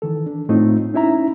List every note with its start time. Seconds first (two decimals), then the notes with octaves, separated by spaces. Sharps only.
0.02 D#3 E3 A4
0.26 D4
0.49 A2 A3 C4 D#4 F4
0.94 C#4 D#4 E4 E5 A#5